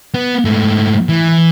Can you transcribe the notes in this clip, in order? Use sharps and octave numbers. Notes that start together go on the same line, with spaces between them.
B3
G#2 A3
E3